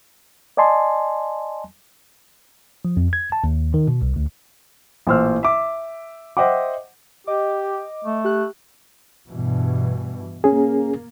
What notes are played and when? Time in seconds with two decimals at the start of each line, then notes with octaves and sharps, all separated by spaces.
0.57 D5 D#5 G#5 A5 C6
2.85 F3
2.97 F2
3.13 G#6
3.32 A5
3.44 D#2
3.74 D#3
3.88 B2
4.02 C2
4.16 D2
5.07 A1 A#2 C5 E6 F6
5.43 E5 D6
6.37 C5 D#5 E5 F#5 G5 D6
7.27 G4 D#5 D6
8.05 A3
8.24 G4 F#6
9.28 G2 B2 E3
10.44 A#3 C#4 G#4